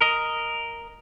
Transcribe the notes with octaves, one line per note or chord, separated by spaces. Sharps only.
A#4 D#5